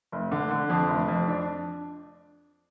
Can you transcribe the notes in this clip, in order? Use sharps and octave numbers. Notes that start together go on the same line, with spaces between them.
F1
D3
D3
F2
F1
F2
D4